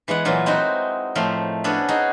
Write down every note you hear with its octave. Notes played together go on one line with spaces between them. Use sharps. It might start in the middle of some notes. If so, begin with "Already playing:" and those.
E3 G#3 B3 F#5
A#2 E3 F#3 F4
G#3 C4 D#4 E4 F#4
A2 F3 A3 C4 A#4 C6
B3 C#4 D4 G#4 A4 C#5
D#4 F#4 G#4